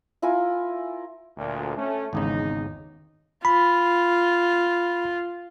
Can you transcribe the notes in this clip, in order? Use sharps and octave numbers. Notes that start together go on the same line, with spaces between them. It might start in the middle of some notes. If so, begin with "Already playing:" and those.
E4 F4 A#4 G#5
D2 A#2
A3 C#4
G#1 E2 G#2 C#3 D#4
F4 B5